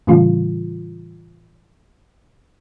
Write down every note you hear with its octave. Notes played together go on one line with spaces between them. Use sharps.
A2 C#3 E3 G3 F4